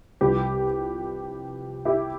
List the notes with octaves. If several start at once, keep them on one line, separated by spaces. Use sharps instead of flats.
C2 C3 F3 G4 B4
E4 G4